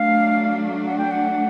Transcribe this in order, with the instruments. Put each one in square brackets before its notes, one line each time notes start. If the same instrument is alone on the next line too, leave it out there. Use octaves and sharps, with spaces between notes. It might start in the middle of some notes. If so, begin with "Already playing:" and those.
Already playing: [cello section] F#3 A3 D4 [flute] F5
[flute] F#5
G5
F#5